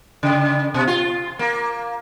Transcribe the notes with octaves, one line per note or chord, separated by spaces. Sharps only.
C#3
B2
F4
A#3